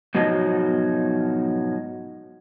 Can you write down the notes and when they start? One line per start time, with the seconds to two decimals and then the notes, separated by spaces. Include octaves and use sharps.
0.15 G#2 B2 F3 F#3 D#4